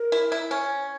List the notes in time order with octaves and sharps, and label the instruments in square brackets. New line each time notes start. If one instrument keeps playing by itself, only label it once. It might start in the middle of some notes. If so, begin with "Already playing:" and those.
Already playing: [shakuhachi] A#4
[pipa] E4
E4
C#4